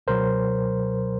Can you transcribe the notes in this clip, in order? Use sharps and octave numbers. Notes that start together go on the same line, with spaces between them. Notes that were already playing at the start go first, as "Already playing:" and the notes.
C#2 B2 F#3 A#4 C5